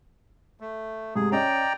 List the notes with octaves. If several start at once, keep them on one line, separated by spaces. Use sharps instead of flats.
A3
G#2 C3 A3 G#4
C#4 D5 D#5 G5 A#5